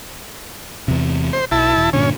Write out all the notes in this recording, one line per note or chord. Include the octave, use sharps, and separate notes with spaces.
E2 C3
C5
B1 E4 A5
E1
G2 A#2 D3 C#4